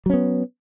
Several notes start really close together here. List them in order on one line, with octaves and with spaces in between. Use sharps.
F#3 C#4 B3